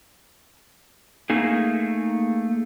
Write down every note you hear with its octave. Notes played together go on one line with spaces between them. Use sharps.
A3 A#3 D#4 G#4